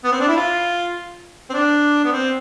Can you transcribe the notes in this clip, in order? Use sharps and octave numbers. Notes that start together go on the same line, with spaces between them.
B3
C4
D4
E4
F4
C4
D4
B3
C4